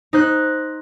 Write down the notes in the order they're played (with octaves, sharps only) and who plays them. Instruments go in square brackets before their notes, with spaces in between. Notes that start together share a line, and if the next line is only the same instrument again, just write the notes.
[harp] D#4 C5 F#6